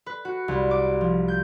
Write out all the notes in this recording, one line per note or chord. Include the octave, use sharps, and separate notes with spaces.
B4
F#4
C2
D6
F3
G6